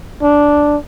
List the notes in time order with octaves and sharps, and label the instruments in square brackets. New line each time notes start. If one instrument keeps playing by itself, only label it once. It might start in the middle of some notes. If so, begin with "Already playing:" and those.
[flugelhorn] D4